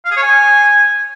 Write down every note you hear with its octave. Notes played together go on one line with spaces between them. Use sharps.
F5
G#4
C#5
G#5